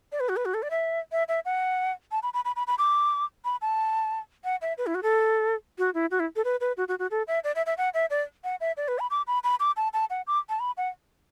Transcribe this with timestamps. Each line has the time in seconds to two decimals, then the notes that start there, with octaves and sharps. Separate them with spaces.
0.12 D5
0.20 B4
0.29 F#4
0.37 B4
0.45 F#4
0.54 A4
0.63 D5
0.71 E5
1.12 E5
1.28 E5
1.45 F#5
2.12 A5
2.23 B5
2.34 B5
2.45 B5
2.56 B5
2.67 B5
2.78 D6
3.45 B5
3.62 A5
4.44 F#5
4.62 E5
4.78 B4
4.87 E4
4.95 F#4
5.03 A4
5.78 F#4
5.94 E4
6.11 F#4
6.20 E4
6.36 A4
6.45 B4
6.61 B4
6.77 F#4
6.88 F#4
6.99 F#4
7.11 A4
7.28 E5
7.44 D5
7.56 E5
7.66 E5
7.78 F#5
7.94 E5
8.10 D5
8.44 F#5
8.61 E5
8.77 D5
8.88 B4
8.99 B5
9.11 D6
9.27 B5
9.44 B5
9.60 D6
9.77 A5
9.93 A5
10.10 F#5
10.27 D6
10.49 A5
10.60 B5
10.77 F#5